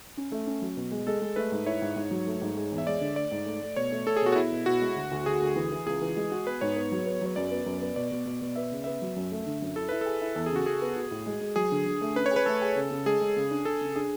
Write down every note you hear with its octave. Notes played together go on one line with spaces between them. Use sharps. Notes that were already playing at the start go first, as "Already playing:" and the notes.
C#4
A3
C#4
F#3
B2
G#3
G#3 A4
G#3
A3 B4
G#2
E4 C#5
G#2
G#2
F#3
A3
G#2
G#3
E2
E5
G#3 D5
D3
A3 D5
G#2
A3
A3
B2 C#5
A3
A3 A4
G#4
B2 F#4
F#4
B2 E4
B2
B2 F#4
G#3
D2
D2
D2 G#4
D2
E3
E3
C#2 G#4
E3
G#3
F#4
B3 B4
G#2 C#5
B3
F#3
B3
F#3 C#5
F#2 D5
B3
F#2
B3
B2 D5
B2
B2
B2
B3 E5
C#3
B3 E5
F#3
F#2
A3
D3
F#2
E4 A4
E4 B4
G#4 A4
E4
E2 A4
C#3 G#4
F#4
C#3 G#4
B3
F#4
A2
G#3
G#3
F#3 G#4
D3
D3
A3
C#4 B4
C#5
G#4
B4
A3 A4
G#4
C#3
C#3
G#3 G#4
G#3
C#3
D4
D4 A4
C#3
D4 G#4